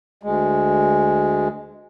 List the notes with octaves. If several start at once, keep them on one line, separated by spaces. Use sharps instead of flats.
D2 G#3